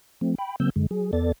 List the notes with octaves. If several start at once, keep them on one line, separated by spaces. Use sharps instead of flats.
F3 A3 C4
G5 B5
C#3 F#3 A#3 C4 E6 G6
F#2 D3 G#3
F#3 G#4
E2 B3 A4 D5 A6